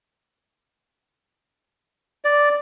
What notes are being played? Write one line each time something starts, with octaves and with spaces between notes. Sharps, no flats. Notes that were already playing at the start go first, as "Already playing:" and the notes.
D5